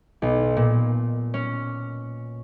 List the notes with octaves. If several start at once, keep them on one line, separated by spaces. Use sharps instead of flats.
B1
A#2
C#4